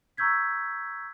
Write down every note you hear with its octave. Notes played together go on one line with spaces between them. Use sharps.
A#5 C#6 E6 G6 G#6 B6